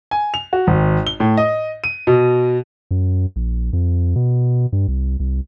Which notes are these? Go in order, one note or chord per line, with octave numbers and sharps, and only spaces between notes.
G#5
F7
F#4
G#1
G7
A2
D#5
D#7
B2
F#2
A#1
F2
B2
G2
C2
C2